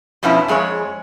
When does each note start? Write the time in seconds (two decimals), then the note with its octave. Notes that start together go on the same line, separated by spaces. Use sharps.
0.23 F2 B2 F3 B3 C#4 E4
0.48 F2 G#3 G#4 C#5